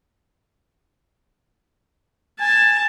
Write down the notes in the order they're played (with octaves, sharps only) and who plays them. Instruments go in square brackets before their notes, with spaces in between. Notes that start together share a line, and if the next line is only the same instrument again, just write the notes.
[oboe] G#5 [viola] A5